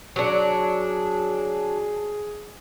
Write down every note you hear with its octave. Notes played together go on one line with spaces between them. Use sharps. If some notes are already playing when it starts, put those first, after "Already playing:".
F#3 D4 G#4